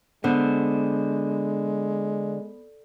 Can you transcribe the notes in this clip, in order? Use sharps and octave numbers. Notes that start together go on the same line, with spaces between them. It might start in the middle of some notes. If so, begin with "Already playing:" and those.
D3 G#3 B3 C5